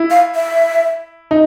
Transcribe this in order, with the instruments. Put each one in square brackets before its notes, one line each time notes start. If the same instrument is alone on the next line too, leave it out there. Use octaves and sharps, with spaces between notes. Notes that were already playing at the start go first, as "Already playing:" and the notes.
Already playing: [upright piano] E4
[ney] F5
E5
[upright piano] D#4